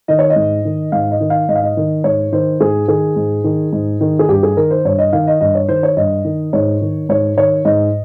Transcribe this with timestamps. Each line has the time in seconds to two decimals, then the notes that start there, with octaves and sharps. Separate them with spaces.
0.08 D#3 D#5
0.19 C#5
0.30 D#5
0.36 G#2
0.65 D#3
0.92 G#2 F5
1.11 D#5
1.20 D#3
1.30 F5
1.49 G#2 D#5
1.56 F5
1.63 D#5
1.77 D#3
2.04 G#2 C#5
2.32 D#3 C5
2.60 G#2 G#4
2.88 D#3 G#4
3.16 G#2
3.44 D#3
3.73 G#2
4.01 D#3
4.19 G#4
4.29 G2 G4
4.43 G#4
4.57 D#3 A#4
4.71 C5
4.85 G2 C#5
4.98 D#5
5.13 D#3 F5
5.27 D#5
5.41 G2 D#5
5.55 C#5
5.69 D#3 C5
5.83 C#5
5.97 G2 D#5
6.25 D#3
6.53 G#2 C#5
6.81 D#3
7.09 G#2 C#5
7.37 D#3 C#5
7.65 G#2 D#5